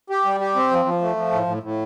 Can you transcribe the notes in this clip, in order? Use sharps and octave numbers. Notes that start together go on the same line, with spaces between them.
G4
G3
G4
C4
F3
F3
A3
F3
A2
A2
A2